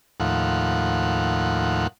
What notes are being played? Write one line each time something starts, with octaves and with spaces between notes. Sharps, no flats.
D#2 A2 F3 F#5